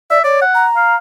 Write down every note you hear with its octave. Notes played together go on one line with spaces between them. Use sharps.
D5 E5
C#5 D5
F#5
A#5
F5